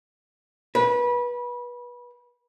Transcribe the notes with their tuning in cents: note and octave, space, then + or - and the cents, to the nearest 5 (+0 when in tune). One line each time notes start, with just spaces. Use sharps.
B4 -25